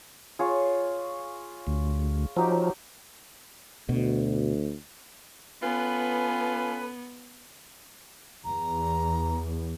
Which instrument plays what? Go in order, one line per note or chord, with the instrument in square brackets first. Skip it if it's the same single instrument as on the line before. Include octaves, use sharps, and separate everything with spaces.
[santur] F4 G#4 C#5
[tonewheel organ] D2
[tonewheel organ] F3 [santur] F#3 D#4 G4
[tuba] D2 [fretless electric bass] B2
[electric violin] B3 [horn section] C#4 A4 B4 [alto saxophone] F4 [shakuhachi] G#5
[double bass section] E2 [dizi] A#5